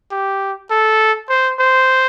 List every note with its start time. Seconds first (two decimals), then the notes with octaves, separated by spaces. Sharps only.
0.11 G4
0.71 A4
1.29 C5
1.59 C5